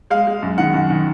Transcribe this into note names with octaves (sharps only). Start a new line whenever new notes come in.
G#3 F5
G#3
F#2
D#3 F#5
F#2
D#3